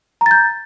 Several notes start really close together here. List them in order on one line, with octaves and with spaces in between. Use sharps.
A#5 A6 G6